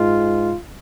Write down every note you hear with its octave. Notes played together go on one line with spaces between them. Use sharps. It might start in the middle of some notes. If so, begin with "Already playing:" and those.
Already playing: G#2 G#3 F4